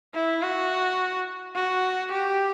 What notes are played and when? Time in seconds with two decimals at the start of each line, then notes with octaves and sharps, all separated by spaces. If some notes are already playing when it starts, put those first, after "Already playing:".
0.14 E4
0.43 F#4
1.55 F#4
2.11 G4